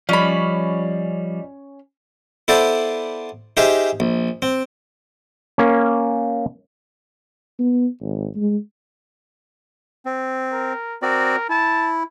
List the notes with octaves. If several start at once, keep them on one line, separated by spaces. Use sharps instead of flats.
F3 G3 C#4 D5 D#5 B5
B3 E4 A4 C5 D5
D#4 G4 G#4 C5 E5 F5
A#1
C4
A#3 C#4
B3
G#1
G#3
C4
A#4
C4 F#4 A#4 D5
E4 A5